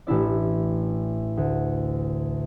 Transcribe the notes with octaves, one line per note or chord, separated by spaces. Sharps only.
A1 D4 E4 D5
D2